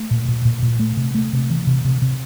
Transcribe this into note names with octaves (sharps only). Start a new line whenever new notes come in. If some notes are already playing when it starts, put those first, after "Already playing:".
Already playing: A3
A#2
A#2
A#2
A#2
A3
C3
A3
C3
E3
C3
C3
C3